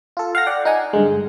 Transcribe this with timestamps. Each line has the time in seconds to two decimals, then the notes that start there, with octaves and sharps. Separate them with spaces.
0.17 F4 A4
0.35 F5 F#5 A#6
0.46 D5 F#5 G5
0.65 D#4 D#5 F#5 G#5
0.93 G2 D3 G#3